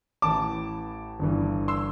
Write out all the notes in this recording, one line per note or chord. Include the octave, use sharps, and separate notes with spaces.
A1 A2 E3 A5 D6
G1 G2 E3
C6 E6